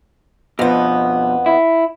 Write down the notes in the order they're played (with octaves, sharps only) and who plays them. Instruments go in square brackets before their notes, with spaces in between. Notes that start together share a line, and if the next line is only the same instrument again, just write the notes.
[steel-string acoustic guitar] F2 B3 [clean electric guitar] B2 F3
[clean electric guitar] E4